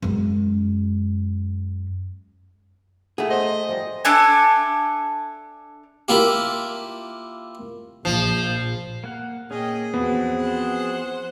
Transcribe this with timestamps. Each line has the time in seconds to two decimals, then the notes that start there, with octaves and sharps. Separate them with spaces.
0.02 F#2 G#3
3.18 A3 G#4 F#5
3.30 C5 D#5
3.69 F3 G3
4.05 D4 A4 E5 G#5
6.08 A#3 E4 F4 G4
8.05 A#1 F3
9.04 A#3 F#5
9.51 A#2 C#4 G#4 D#5 G5
9.94 E2 F3 B3 C4 F#4
10.39 C5 F#5